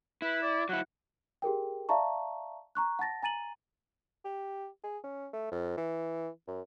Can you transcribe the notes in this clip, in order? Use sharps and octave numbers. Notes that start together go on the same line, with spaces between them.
E4 B4
D5
F#3 E4 F#5
G4 G#4 A#4 G5
D5 E5 F5 A5 A#5 C#6
A#5 C#6 F#6
F#5 A5 A6 A#6
G#5 A#5 A6 D#7 F#7
G4
G#4
C#4
A3
F2
E3
F#2